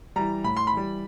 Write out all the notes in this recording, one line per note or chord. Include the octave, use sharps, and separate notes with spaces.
E3 G3 A#5
A2 B5
C6
B5
E3 G3